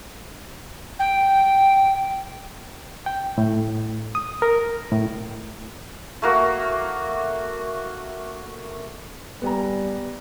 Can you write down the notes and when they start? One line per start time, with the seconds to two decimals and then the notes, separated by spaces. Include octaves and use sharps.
0.99 G5
3.06 G5
3.38 A2
4.15 D#6
4.42 A#4
4.92 A2
6.22 A3 A#3 F#4
9.42 G3 B3 G#5 A#5